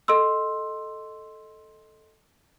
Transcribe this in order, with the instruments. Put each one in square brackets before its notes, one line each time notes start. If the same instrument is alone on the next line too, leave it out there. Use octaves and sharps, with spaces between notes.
[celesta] A4 D#5 C6 E6